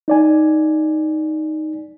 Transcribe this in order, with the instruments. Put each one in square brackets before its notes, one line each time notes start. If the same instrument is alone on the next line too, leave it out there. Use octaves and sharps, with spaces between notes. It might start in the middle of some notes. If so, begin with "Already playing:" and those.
[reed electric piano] D#4 D5 G#5